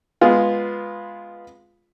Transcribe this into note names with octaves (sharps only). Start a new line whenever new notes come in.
G#3 B3 F4